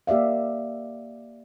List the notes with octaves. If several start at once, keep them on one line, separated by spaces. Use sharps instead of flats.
A#3 G4 D5 E5 F5